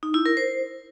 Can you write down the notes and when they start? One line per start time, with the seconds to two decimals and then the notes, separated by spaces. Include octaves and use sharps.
0.03 D#4
0.14 E4
0.26 A#4
0.37 C5